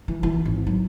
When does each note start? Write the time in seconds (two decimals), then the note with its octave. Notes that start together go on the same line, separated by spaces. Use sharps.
0.08 E3
0.23 E3
0.45 G#1
0.67 F#3